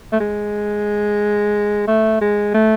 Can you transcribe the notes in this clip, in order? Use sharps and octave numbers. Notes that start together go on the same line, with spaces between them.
A3
G#3
A3
G#3
A3